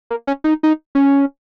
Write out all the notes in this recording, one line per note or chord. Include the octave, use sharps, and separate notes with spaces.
A#3
C#4
D#4
D#4
C#4